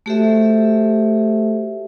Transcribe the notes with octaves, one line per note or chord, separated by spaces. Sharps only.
A3 F#4 G4 A4 C5 E5